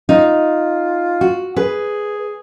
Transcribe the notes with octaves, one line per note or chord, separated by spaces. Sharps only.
D#4 F4
F#4
G#4 B4